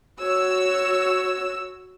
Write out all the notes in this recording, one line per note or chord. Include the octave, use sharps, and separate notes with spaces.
F#4 C#5 E6